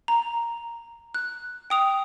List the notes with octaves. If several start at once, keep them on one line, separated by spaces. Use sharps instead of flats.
A#5
F#6
G5 D#6 F7